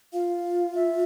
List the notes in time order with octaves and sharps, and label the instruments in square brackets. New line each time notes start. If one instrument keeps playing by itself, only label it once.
[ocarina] F4 [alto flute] F5
[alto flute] E5